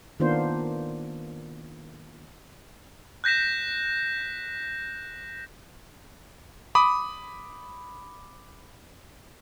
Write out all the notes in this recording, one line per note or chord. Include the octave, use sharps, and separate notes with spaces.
D#3 A#3 B3 D4 F4 C5
F#6 G6 A#6 B6 E7
B5 D6 D#6